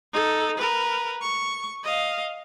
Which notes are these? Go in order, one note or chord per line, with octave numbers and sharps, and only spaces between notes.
D#4 A4
A#4 B4
C#6
D#5 F5